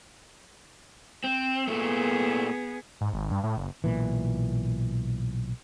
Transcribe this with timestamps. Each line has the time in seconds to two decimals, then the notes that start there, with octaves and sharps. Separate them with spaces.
1.24 C4
1.67 A#2 A3 B3 G#4
3.01 G#2
3.13 G#1
3.31 G2
3.44 A2
3.57 F#1
3.84 B1 A#2 E3